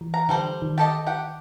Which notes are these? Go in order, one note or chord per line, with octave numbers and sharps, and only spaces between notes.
E3
A#5
D3 G3 A4 C5
D#3
G4 A4 D#5 A5
G4 F#5 G5